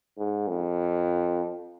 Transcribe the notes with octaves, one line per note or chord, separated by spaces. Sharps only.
G#2
F2